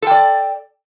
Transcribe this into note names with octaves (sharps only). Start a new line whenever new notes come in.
A4 D5 G5